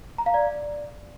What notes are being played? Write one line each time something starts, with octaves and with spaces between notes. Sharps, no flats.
A#5
F5
D5